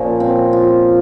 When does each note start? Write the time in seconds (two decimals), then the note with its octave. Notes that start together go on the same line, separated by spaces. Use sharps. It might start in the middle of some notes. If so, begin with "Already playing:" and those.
Already playing: A#2 F3 C#4
0.20 C4
0.53 F4